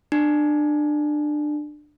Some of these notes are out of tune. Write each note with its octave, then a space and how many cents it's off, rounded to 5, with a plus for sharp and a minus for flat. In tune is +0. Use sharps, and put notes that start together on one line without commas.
D4 +25